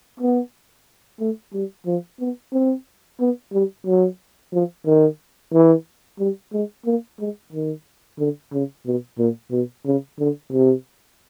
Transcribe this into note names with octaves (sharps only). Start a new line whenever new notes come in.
B3
A3
G3
F3
B3
C4
B3
G3
F#3
F3
D#3
E3
G3
G#3
A#3
G#3
D#3
D3
C#3
B2
A#2
B2
C#3
D3
C3